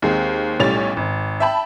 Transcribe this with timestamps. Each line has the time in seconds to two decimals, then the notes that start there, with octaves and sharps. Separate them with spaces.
0.02 D#2 G#3 C4
0.60 B1 A2 G3 C#4 A6 F7
0.97 G#1
1.40 E5 G5 A5 B5